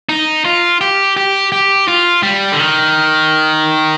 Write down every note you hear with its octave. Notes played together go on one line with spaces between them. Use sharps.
D#4
F4
G4
G4
G4
F4
G3
D3
D#3